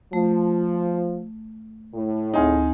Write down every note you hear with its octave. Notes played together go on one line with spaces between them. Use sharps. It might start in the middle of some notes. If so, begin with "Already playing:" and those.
F3 A3
A2
D2 C4 D#4 G#4 D#5